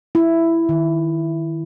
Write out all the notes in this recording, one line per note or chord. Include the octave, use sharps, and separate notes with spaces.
E4
D#3